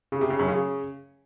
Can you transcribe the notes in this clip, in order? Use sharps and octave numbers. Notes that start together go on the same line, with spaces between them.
C#3
C3
C#3
F#2
C#3